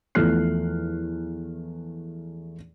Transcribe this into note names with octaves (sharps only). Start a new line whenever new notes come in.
E2 F3 A3 F6 F#6 C7